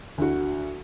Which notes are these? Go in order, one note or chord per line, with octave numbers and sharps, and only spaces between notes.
D2 F#4